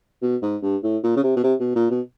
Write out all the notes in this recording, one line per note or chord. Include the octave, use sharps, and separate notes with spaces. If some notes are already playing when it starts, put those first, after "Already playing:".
B2
G#2
G2
A2
A#2
C#3
C3
B2
C3
B2
A#2
B2